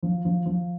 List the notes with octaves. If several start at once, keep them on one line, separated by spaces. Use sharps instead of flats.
F3
F3
F3